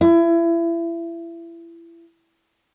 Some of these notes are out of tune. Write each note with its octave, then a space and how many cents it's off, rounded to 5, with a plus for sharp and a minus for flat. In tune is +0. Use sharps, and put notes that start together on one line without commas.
E4 +30